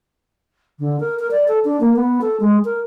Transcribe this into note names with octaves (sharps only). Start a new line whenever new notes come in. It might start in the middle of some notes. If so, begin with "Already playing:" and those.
D3
A#4
A#4
D5
A4
D4
A#3
B3
A4
G#3
A#4